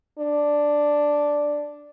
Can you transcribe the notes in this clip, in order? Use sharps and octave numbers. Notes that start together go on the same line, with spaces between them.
D4